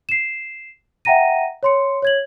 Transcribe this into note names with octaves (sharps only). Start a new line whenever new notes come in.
C7 E7
E5 F#5 G5 A#5 A#6 D#7
C#5 C6 C#7
C#5 G#6 F#7